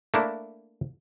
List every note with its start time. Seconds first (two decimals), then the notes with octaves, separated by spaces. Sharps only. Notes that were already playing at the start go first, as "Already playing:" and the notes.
0.14 A3 A#3 D4 E4